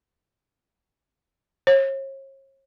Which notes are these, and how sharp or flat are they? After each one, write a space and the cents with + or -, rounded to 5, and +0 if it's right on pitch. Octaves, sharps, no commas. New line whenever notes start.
C#5 -40